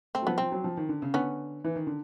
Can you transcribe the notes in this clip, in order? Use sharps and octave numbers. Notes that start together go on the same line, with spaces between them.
A3 C4
F#3
F3 B3
F3 C4
F#3
F3
D#3
D3
C#3
D3 B3 C#4
E3
D#3
D3